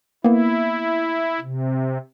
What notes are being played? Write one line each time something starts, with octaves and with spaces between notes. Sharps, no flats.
A#3 B3 E4
C3